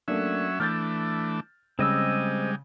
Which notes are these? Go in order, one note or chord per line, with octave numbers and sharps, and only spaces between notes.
F#3 A3 A#3 C#4 D4 E5
E3 A3 D4 F6 G6 A6
C#3 G3 G#3 C4 D#5 E6